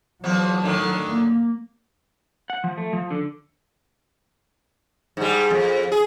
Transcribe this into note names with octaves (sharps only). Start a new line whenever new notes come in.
E2 F3 F#3 F#4
A2 D3 D#3
A#3
F#5
F3
A3
F3
D3
G#2 G3
F2
G#4